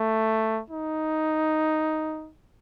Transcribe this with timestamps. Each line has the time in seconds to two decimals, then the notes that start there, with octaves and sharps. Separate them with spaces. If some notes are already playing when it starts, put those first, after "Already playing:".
Already playing: A3
0.70 D#4